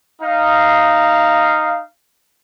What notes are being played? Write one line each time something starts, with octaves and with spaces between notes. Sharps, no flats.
D#4 F5